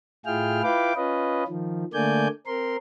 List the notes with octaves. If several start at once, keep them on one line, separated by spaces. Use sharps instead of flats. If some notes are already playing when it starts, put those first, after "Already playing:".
A2 E4 F4 G#4 G5 F6
E4 F4 B4 F5 G5 D6
C#4 F4 B4 D#5
D#3 F3
D3 A3 A#3 D5 G#5 G6
C4 A#4 C6